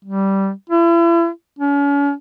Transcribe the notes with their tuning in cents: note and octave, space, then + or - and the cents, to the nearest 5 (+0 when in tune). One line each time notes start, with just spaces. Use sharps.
G3 -10
E4 +40
C#4 +40